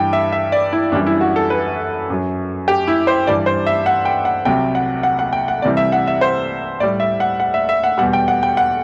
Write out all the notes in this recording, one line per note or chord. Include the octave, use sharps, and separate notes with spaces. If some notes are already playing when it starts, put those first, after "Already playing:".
Already playing: G2 E3 G3 G5
E5
E5
D5
E4
F#2 E3 G3 D4
E4
F#4
A4
B4
F#2 F#3
G4
E4
C5
G2 E3 G3 D5
C5
E5
F#5
G5
F#5
C2 C3 F#3 G5
F#5
F#5
F#5
G5
F#5
C2 C3 E3 G3 D5
E5
F#5
E5
C5
A2 G3 D5
E5
F#5
F#5
E5
E5
F#5
E2 B2 G3 F#5
G5
F#5
G5
F#5